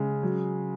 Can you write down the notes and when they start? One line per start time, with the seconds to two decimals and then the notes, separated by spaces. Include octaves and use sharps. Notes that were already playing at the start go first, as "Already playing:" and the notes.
Already playing: C#3 G#3
0.23 F#3